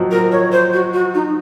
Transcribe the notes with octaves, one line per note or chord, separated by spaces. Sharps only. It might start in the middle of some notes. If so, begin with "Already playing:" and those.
Already playing: D#3 F3 F#3
A#4
C#5
C5
F#4
F#4
D#4